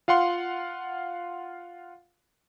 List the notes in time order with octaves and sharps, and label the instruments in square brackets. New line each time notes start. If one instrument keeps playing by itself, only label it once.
[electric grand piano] F4 F5 F#5 C6